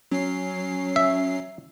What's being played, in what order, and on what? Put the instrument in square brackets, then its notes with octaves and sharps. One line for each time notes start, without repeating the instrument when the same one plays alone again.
[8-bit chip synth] F#3 C7 [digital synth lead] C#4
[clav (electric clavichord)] E5